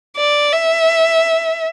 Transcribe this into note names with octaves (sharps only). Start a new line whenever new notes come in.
D5
E5